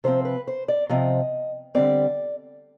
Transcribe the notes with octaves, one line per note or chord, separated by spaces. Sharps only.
C3 F3 C4 C5
B4
C5
D5
C3 F3 C4 D#5
D3 G3 C4 D5